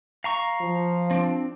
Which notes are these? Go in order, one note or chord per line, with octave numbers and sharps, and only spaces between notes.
F5 A#5 C#6
F3
C4 D4